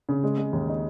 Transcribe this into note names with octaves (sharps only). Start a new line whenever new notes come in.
C#3
G#3
G#3
D#2
D#4